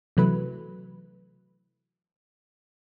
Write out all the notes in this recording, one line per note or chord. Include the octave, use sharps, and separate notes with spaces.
C3 E3 F#3 A3 B4